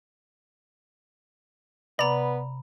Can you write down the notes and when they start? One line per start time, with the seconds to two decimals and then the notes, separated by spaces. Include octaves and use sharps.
1.99 C3 B3 D5 A#5 B5